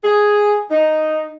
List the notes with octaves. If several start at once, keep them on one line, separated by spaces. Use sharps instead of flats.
G#4
D#4